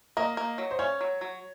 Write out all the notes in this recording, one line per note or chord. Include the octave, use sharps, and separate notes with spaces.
A#3 D#5
A#3
F#3
C5
C#4 C#5
F#3
F#3